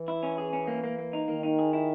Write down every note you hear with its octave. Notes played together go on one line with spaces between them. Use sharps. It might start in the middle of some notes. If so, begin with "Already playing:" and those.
Already playing: E3
E4
C#4
G#4
C#4
A#3
A#3
A#3
D#4
D#3 A#3
D#4
G#4
E4